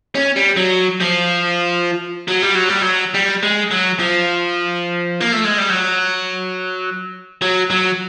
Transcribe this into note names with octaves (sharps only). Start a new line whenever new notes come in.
C#4
G3
F#3
F3
F#3
G3
F#3
G3
F#3
G3
G#3
F#3
F3
A#3
A3
G#3
G3
F#3
F#3
F#3